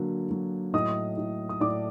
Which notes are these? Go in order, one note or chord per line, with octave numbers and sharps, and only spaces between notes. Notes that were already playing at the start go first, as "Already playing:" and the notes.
Already playing: D3 F#3 A#3
F#3
A2 D#5 D#6
A2
D#6
A2 D5 D6